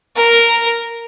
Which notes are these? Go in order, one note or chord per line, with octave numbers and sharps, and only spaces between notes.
A#4